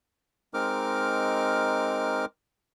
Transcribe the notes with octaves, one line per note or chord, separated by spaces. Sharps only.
G#3 C4 D#4 A#4 D6 F6